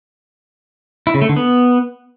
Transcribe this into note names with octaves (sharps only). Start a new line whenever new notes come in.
E4
C#3
A3
D3
B3